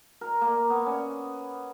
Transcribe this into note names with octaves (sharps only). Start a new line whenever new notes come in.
A#4
A#3
B3
C#4